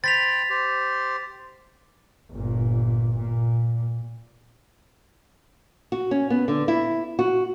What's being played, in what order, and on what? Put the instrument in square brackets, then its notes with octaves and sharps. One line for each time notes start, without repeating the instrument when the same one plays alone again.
[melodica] C5 G5 B5 [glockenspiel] A6 B6 F7
[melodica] G4 C5
[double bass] G1 A#2
A#2
[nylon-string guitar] F#4
C#4
B3
D3
E4
F#4